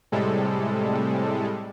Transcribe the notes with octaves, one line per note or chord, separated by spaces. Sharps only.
A2 C3 G3 G#3 A4